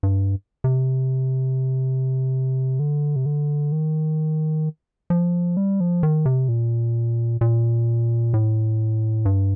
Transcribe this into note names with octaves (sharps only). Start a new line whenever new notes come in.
G2
C3
D3
C3
D3
D#3
F3
G3
F3
D#3
C3
A#2
A#2
A2
G2